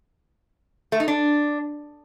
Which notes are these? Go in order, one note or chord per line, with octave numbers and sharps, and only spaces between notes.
A3
D#4
D4